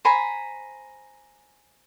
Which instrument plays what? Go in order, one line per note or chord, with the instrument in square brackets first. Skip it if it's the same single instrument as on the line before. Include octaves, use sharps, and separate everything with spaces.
[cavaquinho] C5 G#5 A#5 B5